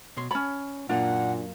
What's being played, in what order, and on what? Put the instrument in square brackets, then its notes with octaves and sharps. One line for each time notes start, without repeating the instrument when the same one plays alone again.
[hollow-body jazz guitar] B2 C#5 C6
[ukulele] C#4 B5 [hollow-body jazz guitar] C#5 A5
[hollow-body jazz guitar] F#2 A#3 F4 [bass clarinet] A#2 [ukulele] D4 [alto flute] F#5